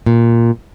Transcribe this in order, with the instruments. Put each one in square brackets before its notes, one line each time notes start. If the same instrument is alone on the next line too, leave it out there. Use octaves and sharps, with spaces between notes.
[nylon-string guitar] A#2